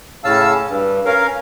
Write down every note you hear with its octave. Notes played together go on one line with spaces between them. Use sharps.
A2 C#3 C#4 F5 A5 E6
G2
C#4 A#4 F5